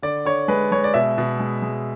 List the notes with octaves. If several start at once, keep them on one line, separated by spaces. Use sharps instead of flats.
D3 D5
D3 C#5
G#3 B4
G#3 C#5
D5
B2 E5
B2
G#3
G#3